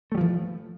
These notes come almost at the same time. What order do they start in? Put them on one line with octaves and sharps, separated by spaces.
A3 G3 F3 E3